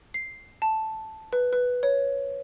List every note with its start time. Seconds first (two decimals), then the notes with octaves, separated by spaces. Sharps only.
0.14 C7
0.62 A5
1.33 B4
1.53 B4
1.83 C#5